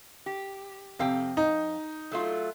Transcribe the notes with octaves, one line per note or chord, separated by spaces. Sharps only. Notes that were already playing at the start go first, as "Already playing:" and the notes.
G4
F2 C3 F5 G5
D#4
F#3 A3 F4